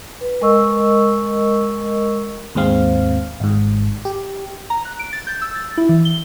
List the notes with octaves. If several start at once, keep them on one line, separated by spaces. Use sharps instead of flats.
B4
G#3 A#4 D#5 C#6 E6
D#2 G#2 G#3 C4 F5
G#1 G#2
G4
A#5
F#6
D7
A6
G6
E6
A6
E4
E3
G7